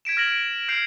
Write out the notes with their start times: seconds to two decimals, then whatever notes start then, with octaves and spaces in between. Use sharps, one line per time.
0.05 G#6 B6 D7 E7
0.17 F6 A#6 F#7
0.32 D7
0.68 F6 G6 C7 D7 F7